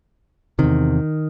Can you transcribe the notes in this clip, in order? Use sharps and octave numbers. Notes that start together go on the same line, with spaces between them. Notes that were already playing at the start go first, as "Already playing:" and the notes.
E2 C3 D#3